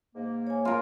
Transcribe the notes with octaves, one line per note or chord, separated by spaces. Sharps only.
G#2 A#3
C#5 G#5
F4 A#4